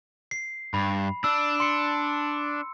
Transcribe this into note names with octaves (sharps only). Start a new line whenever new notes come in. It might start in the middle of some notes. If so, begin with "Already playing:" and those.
C7
G2 B5
D4 E6
C6 C#7